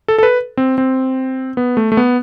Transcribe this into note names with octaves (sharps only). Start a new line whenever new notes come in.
A4
A4
B4
C4
C4
B3
A3
A3
B3